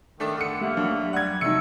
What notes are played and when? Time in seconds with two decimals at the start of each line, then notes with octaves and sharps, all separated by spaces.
0.20 D#3 A3 D4 A4
0.37 D3 D4 C#7
0.61 A3 A#3 G4 E5 F#5
0.77 D#2 F#3 D4
1.13 G3 F#5 G#6
1.41 C3 F#3 A3 D#4 E6 C#7